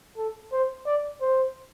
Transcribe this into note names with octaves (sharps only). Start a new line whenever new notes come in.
A4
C5
D5
C5